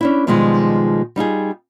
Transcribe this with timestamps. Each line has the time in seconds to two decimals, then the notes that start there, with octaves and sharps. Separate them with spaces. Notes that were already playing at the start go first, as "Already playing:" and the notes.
0.01 C#4 D4 E4
0.27 B2 D#3 F3 G3 G#3
1.16 G3 D#4 F4 G#4